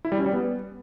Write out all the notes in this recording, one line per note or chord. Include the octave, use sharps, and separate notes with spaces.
E4
G3
C#4
G3
B3